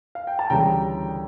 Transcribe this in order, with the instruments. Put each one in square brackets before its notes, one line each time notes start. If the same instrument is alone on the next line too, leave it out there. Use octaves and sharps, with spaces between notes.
[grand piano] F5
G5
A5
D2 C#3 E3 G3 G5 A#5